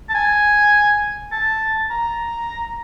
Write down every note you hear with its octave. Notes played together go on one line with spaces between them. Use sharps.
A5
G#5
A5
A#5